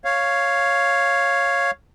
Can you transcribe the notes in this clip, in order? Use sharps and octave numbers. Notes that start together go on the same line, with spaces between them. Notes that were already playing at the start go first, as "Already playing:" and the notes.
C#5 F5